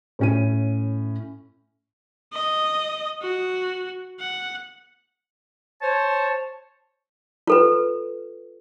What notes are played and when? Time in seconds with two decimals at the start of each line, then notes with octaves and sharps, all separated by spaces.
0.19 A2 C#4 D#7
2.33 D#5
3.22 F#4
4.20 F#5
5.82 C5 C#5 A5
7.47 F4 A4 B4